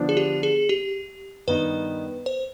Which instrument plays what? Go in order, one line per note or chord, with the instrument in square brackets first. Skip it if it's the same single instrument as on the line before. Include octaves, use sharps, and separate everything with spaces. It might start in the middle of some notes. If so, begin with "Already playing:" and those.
Already playing: [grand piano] D3 F3 B3 D4
[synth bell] G#4
G4
G#4
G4
[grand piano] G2 D#3 B3 D#4 [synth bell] B4
[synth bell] C5